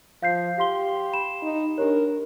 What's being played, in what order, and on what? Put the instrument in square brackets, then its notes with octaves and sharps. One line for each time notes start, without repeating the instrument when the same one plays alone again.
[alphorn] F3 [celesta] F5 G6 C7
[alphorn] G4 [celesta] F5 C6 G7
[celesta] B5 E7
[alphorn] D#4
[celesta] D4 G4 C#5 [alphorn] A#4